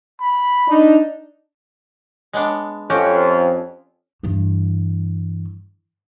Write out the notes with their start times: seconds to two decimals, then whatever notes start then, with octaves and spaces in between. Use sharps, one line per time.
0.20 B5
0.68 D4 D#4
2.33 G#3 B3 D4
2.90 F2 C#4 F#4 G4
4.23 G2 E3